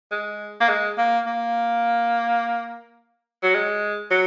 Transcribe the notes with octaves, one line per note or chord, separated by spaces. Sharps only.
G#3
A#3
G#3
A#3
A#3
F#3
G#3
F#3